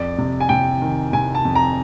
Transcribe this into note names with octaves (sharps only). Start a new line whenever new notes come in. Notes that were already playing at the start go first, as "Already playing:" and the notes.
Already playing: F2 D5
C3
G#5
C3 G5
D#3
C3 G#5
A5
F2
A#5